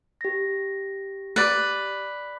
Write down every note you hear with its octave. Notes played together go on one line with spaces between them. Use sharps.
G4 A#6
B4 D5